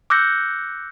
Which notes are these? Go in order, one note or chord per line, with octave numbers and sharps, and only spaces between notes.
D6 E6 F#6 G6 A#6 C#7